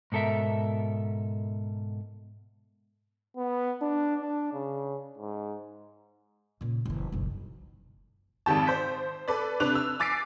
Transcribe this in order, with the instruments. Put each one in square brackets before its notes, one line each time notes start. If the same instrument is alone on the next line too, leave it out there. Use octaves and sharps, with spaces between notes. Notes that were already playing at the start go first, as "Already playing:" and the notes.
[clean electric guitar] G#2 B2 A4 A#4 E5
[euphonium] B3
D4
D4
C#3
G#2
[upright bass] A#2 C#3
F#1 E3
F#1 B1
[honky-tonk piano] G#1 F2 D#3 G4 A5
C5 G6 B6
A4 B4 D5
C3 D4 B4 F#6 F7
E6
G#5 D6 A6 B6 C7 D7